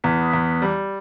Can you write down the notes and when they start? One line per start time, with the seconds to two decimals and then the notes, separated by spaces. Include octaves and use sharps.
0.04 E2 B3
0.33 E2
0.62 G3